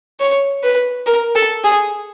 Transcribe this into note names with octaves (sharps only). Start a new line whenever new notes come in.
C#5
B4
A#4
A4
G#4